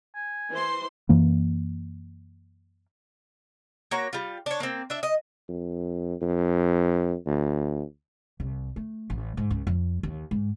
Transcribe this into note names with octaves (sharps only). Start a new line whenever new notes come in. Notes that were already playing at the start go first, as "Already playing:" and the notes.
G#5
E3 C5 C6
F#2 E3 A#3
A#3 F#4 C#5 A#5
G3 F4
D4 C#5
A#3 C4
D4 E5
D#5
F2
F2
D2
C2
A3
A1
G#2
C#2
F2
D#2
G#2